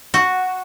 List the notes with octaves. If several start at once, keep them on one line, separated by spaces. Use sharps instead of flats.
F#4